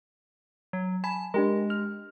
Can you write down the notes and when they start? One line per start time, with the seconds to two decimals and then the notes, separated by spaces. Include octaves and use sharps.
0.73 F#3
1.04 G#5 A5 B5
1.34 G#3 D4 G4 A#4
1.70 F6